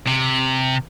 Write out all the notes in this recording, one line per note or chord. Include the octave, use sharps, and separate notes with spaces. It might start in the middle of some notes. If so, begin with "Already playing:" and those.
C3